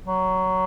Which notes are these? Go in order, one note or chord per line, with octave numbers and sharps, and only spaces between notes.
F#3